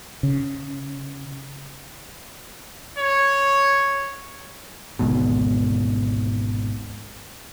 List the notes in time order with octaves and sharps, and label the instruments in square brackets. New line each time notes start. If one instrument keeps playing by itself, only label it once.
[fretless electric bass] C#3
[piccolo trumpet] C#5
[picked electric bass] G#1 D2 G#2 B2